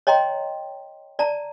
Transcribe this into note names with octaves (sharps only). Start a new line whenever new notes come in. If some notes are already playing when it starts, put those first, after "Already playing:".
C#5 D#5 G5 A#5 C6
D5 A5 A#5